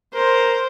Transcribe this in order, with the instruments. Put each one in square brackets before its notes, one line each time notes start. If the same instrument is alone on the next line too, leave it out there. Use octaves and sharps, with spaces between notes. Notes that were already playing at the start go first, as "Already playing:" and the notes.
[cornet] A#4 [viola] C5